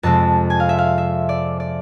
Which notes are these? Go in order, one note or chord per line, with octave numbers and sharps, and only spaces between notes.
F2 C3 G#3 C4 A5
G#5
F5
E5
F5
E5
D5
D5